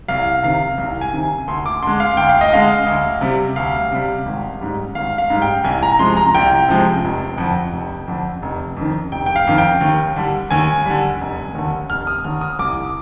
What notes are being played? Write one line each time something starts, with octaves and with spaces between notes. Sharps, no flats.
C2 F5
C3 D#3 F5
C2
G#5
C3 D#3
D2 C6
D6
D3 G#3 C6
F5
D2 G5
F5
D#5
D3 G#3 F5
D2
C3 G3
D2 F5
C3 G3
G#1
G#2 G3
G#1 F5
F5
G#2 G3
G5
C2 G#5
A#5
C3 F3 G#3 C6
A#5
C2 G5
C3 F3 G#3
F1
F2 D3
F1
F2 D3
F1
F2 D#3
F1 G5
G5
F5
F2 D#3
G5
D#2
D3 G3
D#2 G#5
D3 G3
F1
D#2 D3
F1 F6
D#6
D#2 D3 F6
D#6
C2 D6